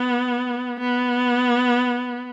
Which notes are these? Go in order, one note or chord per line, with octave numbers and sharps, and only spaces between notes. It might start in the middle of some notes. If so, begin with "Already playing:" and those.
Already playing: B3
B3